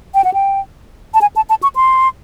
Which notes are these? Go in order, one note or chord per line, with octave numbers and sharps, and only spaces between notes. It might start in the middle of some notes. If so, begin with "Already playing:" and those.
G5
F#5
G5
A5
G#5
A5
A5
C#6
C6